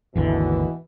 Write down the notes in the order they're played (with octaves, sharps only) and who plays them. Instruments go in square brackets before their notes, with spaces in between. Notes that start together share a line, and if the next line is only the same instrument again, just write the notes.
[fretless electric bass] G#1 D#2 D3 [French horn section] B2 E3